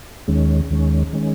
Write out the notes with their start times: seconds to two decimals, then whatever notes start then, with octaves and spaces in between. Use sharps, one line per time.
0.28 D#2 D#3 G#3 C#4
0.70 D#2 D#3 G#3 C#4
1.13 D#3 G#3 C#4